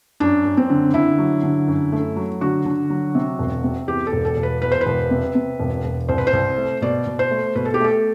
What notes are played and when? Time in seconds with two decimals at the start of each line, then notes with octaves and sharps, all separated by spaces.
0.20 F#2 D4
0.45 F#2
0.57 C4
0.70 D3
0.94 D3 E4
1.18 F#3
1.43 D3
1.68 F#2
1.92 A3
2.16 F#3
2.41 D3 F#4
2.65 D3
2.90 F#3
3.15 C3
3.39 E1
3.64 C3
3.88 E2 G4
4.07 A4
4.13 E1
4.25 A4
4.37 E1
4.43 B4
4.62 E2 B4
4.72 C5
4.81 B4
4.86 E1
5.11 C3
5.35 C3
5.60 E1
5.84 E1
6.09 C2 C5
6.18 B4
6.27 C5
6.33 C2
6.58 A3
6.82 B2 D5
7.06 B2
7.19 C5
7.31 A3
7.55 B2 B4
7.65 A4
7.74 G4
7.80 A3 A4